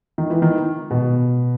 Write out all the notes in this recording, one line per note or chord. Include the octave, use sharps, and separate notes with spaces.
D#3
E3
D#3
B2